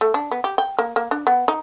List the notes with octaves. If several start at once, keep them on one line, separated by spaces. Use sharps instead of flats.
A3
D4
B3
G4
G5
A#3
A#3
D4
B3
D#4